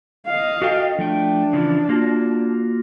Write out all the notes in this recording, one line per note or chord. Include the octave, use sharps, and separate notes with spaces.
D#5 F5
F#4 A4 G5
F3 A3 D4 G5
C#3 E3 F3
A#3 F4 F#4